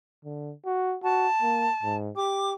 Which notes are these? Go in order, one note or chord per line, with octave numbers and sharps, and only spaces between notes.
D3
F#4
F#4 A5
A#3
G#2
G4 D6